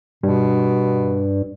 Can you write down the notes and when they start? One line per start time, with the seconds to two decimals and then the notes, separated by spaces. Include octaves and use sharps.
0.23 G2 B2